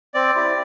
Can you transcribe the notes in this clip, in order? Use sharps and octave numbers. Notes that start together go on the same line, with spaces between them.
C4 D5
E4 G4